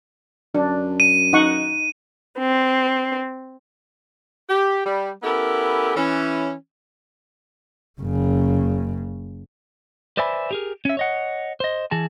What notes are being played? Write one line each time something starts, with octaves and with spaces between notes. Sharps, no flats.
F#2 D4
D#7
D#4 F#5 C#6
C4
G4
G3
B3 C#4 E4 G4 A4 A#4
E3 C#4
F#1 C#3
B4 C5 D5 E5 G#5 B5
G4 G#4 A#4
C#4 E5
C#5 D#5 F#5
C5 D#5
E3 G#4 A5